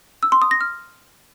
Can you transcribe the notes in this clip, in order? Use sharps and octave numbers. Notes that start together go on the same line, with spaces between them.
E6
C6
D#6
A#6
F6